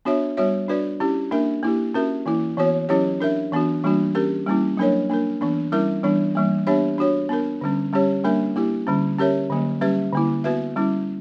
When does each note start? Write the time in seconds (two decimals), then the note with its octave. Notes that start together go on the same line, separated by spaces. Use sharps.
0.05 B3 D4 F#4 C#5 E5
0.37 G3 B3 F#4 C#5 E5
0.68 D4 F#4 B4 D5
1.00 C#4 E4 G4
1.31 A#3 D4 A#4 E5
1.63 A#3 E4 G4
1.94 C#4 F#4 A#4 E5
2.26 E3 A#3 E4
2.57 E3 B3 F#4 C#5
2.89 F#3 C#4 E4 G4 C#5
3.21 D4 A#4 E5
3.52 E3 B3 D4 F#4
3.84 E3 G3 A#3 D4 F#4
4.15 C#4 G4 A#4
4.46 G3 A#3 C#4 E4
4.77 F#3 A#3 D4 A#4 C#5
5.09 A#3 D4 A#4
5.41 E3 B3 D4
5.72 G3 C#4 E4 A#4 E5
6.03 E3 G3 B3 D4
6.35 E3 G3 A#3
6.67 B3 D4 G4 C#5 E5
6.98 D4 F#4 C#5
7.29 B3 D4 A#4
7.61 D3 G3 C#4
7.93 G3 C#4 G4 C#5
8.24 G3 A#3 D4 A#4 E5
8.56 A#3 E4 G4
8.87 D3 G3 C#4
9.18 C#4 G4 A#4 C#5 E5
9.50 D3 F#3 A#3
9.81 G3 C#4 G4 B4 E5
10.13 D3 A#3 E4
10.44 B3 F#4 B4 E5
10.76 G3 C#4 E4